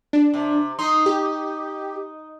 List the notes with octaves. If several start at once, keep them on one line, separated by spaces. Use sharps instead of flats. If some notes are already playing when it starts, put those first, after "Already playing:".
D4
C3
D#4 C6
G4